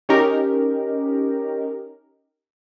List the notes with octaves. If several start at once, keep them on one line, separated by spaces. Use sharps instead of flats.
C#4 D#4 G4 A#4